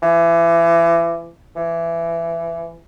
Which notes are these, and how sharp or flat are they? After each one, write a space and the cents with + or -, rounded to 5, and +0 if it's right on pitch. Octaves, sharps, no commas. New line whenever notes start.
E3 +30
E3 +20